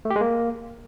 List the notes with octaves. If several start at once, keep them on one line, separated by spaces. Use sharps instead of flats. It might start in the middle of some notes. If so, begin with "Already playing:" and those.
A3
G4
G#3
A#3